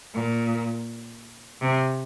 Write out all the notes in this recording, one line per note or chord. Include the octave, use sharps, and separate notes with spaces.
A#2
C3